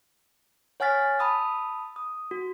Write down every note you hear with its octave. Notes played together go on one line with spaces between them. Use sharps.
C#5 F#5 G#5 F6 A6 B6
A5 B5 D#6 E6
D#6
F#4